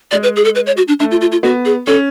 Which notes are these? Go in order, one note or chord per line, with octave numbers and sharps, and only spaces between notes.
G#3 D5
B4
G#4
A4
B4
C#5
F#4
D4
A3 D4
F4
F4
F4
B3 F#4
G#4
C#4 A4